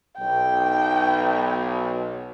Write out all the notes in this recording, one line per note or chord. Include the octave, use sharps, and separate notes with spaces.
B1 G5